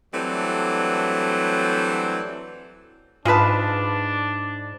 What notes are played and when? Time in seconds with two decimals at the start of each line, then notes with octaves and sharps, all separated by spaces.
0.14 E3 F#3 G3 A3 C4 D4
3.25 G#2 G#3 D4 F4 G#4 B4 A5